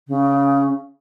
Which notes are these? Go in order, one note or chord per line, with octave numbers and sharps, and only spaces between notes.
C#3